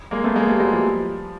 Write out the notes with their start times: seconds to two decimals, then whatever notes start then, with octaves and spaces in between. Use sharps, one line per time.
0.11 G#3 A#3
0.24 A3 B3
0.36 G#3 A#3
0.48 G3 A3
0.60 F#3 G#3
0.72 F3 G3